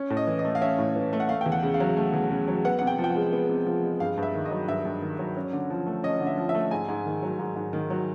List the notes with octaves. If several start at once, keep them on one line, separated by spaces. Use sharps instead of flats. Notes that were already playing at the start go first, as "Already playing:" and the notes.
Already playing: C#4
A2
D#5
E3
D#5
A3
F5
C#4 E5
A2
E3
A3
F#5
A3 F5
E2 G5
F#5
C#3
F5
F#3
A3
E2
C#3
F#3
B3 F#5
C3 F#5
G5
F3
G5
F#5
G#3
B3
C3
F3
G#3
G2 F5
G2
E5
D#3
D#5
F#3
G2 E5
G2
D#3
F#3
C#4
D3
F3
A3
C#4 D#5
D3
E5
F3
E5
A3
G#2 G#5
G#2
D#3
F#3
G#2
G#2
D#3
F#3